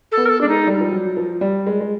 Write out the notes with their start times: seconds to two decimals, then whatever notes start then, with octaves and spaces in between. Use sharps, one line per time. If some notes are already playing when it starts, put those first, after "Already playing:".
0.12 A4
0.17 B3
0.26 A#4
0.29 A4
0.41 G#3 D4
0.49 D#4
0.67 G3
0.81 F3
0.92 F#3
1.17 F3
1.41 G3
1.66 G#3
1.80 G#3